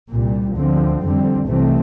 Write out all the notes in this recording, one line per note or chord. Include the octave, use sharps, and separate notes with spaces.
C2 A#2 G3
D2 D3 F3 C4
F2 D3 G3 C4
C2 C3 E3 A3 C4